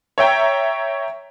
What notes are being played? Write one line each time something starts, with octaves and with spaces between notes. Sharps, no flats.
C#5 E5 G5 A#5